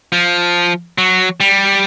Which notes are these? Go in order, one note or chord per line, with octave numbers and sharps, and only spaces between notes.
F3
F#3
G3